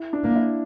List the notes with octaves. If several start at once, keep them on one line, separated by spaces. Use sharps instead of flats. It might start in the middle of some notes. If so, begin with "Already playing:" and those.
Already playing: E4
D4
A#3
E4